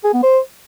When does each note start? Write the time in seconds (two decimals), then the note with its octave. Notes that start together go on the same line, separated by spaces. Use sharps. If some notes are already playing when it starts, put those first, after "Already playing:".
0.04 G#4
0.14 B3
0.23 C5